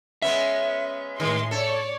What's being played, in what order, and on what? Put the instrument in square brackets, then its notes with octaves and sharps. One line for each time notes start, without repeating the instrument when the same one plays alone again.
[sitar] G#3 B3 C#4 [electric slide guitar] E5
[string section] A2 G#3 C6 [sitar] D#3
[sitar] A4 [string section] C#5 D5